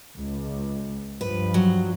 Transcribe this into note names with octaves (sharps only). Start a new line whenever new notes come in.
C#2
G2 F3 B4
F#3